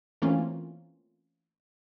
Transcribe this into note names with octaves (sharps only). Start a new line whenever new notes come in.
E3 A3 A#3 C4 C#4 F4